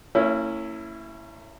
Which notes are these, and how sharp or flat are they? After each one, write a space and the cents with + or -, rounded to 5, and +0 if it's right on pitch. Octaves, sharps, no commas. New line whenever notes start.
A#3 -45 C#4 +0 E4 +0